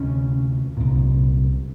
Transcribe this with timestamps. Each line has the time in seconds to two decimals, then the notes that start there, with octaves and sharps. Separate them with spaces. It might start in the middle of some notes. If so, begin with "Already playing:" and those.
Already playing: D2 C3 C#4
0.77 C2 A#2